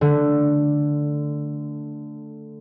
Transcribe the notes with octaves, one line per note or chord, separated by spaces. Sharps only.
D3 A3